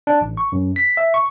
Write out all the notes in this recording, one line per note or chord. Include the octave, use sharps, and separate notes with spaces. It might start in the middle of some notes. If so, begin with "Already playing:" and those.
D4
A1
C#6
F#2
B6
E5
C#6